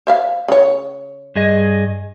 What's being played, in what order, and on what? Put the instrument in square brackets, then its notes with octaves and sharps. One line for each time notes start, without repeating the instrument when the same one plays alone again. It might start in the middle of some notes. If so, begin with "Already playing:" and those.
[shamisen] C5 E5 F5
C#3 C#5
[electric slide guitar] G2 G#4 D#5